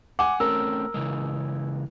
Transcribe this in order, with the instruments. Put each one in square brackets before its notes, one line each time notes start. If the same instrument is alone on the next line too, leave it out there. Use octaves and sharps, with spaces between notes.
[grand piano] F#5 G#5 [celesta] D6
[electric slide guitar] A3 C4 C#4 [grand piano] A#4 [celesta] E6
[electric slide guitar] C#3 E3 G#3